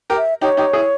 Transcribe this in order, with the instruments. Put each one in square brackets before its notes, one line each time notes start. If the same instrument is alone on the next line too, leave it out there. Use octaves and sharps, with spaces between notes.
[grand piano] G4 A#4
[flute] E5
[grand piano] D#4 G4 [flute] C#5
[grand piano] D#4 G4
E4 G#4